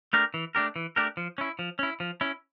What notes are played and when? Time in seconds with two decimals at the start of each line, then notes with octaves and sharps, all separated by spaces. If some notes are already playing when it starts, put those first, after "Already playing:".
0.13 A3 D4 G4 A#4
0.34 E3
0.55 A3 D4 G4 A#4
0.76 E3
0.96 A3 D4 G4 A#4
1.17 F3
1.38 C#4 E4
1.59 F3
1.79 C#4 E4
2.00 F3
2.21 C#4 E4